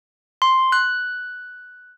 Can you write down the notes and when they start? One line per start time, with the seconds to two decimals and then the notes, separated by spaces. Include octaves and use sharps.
0.42 C6
0.72 F#6